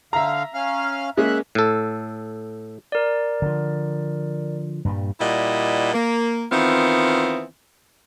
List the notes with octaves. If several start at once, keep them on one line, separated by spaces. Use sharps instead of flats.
D3 E5 F5 A#5
C#4 F5 F6
G#3 A#3 C#4 E5 F#6
A2 A4
A#4 D5
D3 F3
G2 A#2 G3
A#2 G3 E4 D#5 F#5
A#3
D#3 E3 B3 C4 F4